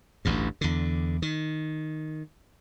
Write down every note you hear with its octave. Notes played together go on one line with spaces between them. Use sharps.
A1 D2 G2
E2 D3
D#3